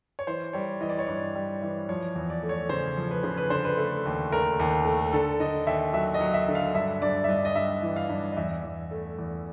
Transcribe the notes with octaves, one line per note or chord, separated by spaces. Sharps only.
C#5
E3 C5
G3 C#5
E3 D#5
D5
C#5
G2 D5
G3
E3
F3 C#5
E2
D5
A3
C#5
C#3 C5
F3
B4
C#3 C5
B4
D3 C5
B4
A3
D#2
A3 A#4
D#2
A3
D3 A4
D3 D#5
D#2 E5
F#3 E5
D#5
F#3
E5
D3
F5
G2 E5
G2 D5
E5
G2 D#5
D#5
G2 E5
E3
F5
G2
D#5
E2 E5
E2
A3
E2